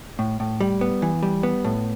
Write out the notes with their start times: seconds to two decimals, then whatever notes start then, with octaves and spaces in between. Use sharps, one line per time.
0.19 A2
0.40 A2
0.60 G3
0.81 B3
1.02 E3
1.23 G3
1.43 B3
1.65 A2